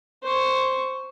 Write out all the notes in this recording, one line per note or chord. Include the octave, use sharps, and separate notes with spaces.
C5 C#6